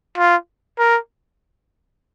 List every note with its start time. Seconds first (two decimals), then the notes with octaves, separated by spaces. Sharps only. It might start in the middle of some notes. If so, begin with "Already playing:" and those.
0.18 F4
0.79 A#4